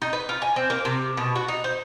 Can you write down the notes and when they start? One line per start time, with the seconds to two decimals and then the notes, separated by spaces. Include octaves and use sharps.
0.02 D#4
0.13 B4
0.29 F4
0.42 G#5
0.56 C4
0.70 A#3
0.85 C3
1.17 B2
1.36 F#4
1.48 D#4
1.64 C5